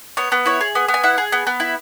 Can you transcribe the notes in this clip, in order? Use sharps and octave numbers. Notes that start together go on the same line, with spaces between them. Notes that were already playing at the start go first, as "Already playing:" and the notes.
B3 C#5
B3
E4 C#5
G#4
B3
B3
G#5
E4 F#5
G#4
B3
B3
E4